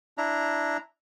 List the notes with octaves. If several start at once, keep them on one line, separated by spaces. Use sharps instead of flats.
D4 E4 A#5